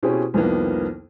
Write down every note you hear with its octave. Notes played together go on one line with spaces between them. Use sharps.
B2 C4 C#4 E4 G4 G#4
C2 F2 D#3 F3 A#3 B3